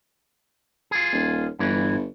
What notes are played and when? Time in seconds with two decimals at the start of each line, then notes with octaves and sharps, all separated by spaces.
0.91 F4 G#4
1.12 D#1
1.59 G1 G2 E3